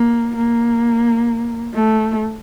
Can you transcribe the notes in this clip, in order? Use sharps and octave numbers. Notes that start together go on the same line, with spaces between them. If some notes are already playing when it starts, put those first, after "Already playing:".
Already playing: A#3
A#3
A3